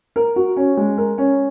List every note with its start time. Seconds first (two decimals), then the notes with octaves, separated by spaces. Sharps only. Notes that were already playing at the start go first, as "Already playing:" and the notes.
0.16 A#4
0.36 F#4
0.57 C#4
0.77 G#3
0.98 A#4
1.18 C#4